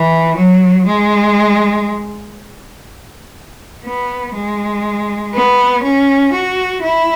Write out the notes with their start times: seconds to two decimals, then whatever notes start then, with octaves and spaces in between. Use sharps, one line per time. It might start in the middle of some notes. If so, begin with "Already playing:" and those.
Already playing: E3
0.37 F#3
0.87 G#3
3.85 B3
4.34 G#3
5.33 B3
5.83 C#4
6.33 F#4
6.82 E4